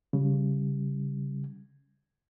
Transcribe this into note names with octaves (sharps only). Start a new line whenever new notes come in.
C#3 G3